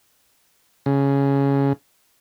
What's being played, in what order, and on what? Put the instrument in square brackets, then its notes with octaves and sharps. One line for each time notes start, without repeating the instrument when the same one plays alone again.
[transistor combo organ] C#3